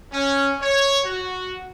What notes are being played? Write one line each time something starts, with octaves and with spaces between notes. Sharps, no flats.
C#4
C#5
F#4